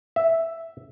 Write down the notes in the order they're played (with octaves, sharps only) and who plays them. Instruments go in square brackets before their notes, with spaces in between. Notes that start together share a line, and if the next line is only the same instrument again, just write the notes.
[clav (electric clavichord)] E5